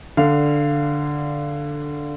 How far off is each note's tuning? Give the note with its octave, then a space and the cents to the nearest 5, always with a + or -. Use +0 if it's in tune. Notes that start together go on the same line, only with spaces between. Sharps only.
D3 +0 D4 +0 F5 -15